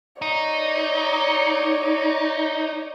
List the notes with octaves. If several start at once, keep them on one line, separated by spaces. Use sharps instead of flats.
D#4 C#5 D5